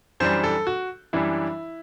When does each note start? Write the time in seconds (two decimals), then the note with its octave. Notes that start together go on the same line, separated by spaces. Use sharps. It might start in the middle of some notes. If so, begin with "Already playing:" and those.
0.20 F#2 E3 G3 D4 C5
0.44 A4
0.67 F#4
1.13 F#2 E3 G3 D4 E4